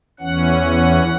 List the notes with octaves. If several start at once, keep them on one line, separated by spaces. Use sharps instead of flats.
E2 E3 C#4 F#5